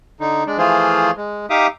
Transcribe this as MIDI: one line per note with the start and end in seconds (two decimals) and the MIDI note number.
0.20 0.44 50
0.20 0.44 63
0.47 0.58 56
0.47 0.58 62
0.58 1.11 52
0.58 1.11 53
0.58 1.11 57
0.58 1.11 65
0.58 1.11 68
0.58 1.11 72
1.17 1.46 56
1.50 1.67 63
1.50 1.67 67
1.50 1.67 76
1.50 1.67 77
1.50 1.67 86
1.50 1.67 87